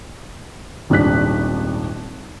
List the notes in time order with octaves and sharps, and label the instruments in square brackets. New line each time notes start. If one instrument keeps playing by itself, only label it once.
[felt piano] D#1 G#1 D4 F#6 B6